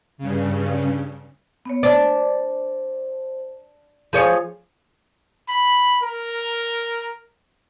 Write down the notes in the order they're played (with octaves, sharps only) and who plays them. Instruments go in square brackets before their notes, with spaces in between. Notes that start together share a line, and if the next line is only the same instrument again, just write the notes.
[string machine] G2 C#3
[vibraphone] B3 C#5
[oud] D4 [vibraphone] C5
[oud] F3 G#4 C#5
[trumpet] B5
A#4